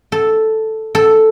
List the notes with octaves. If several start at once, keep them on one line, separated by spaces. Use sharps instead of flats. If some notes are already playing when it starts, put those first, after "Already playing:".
A4
A4